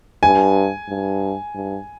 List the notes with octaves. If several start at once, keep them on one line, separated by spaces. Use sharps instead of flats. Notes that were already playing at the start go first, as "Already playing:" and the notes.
G2 G#5
G2
G2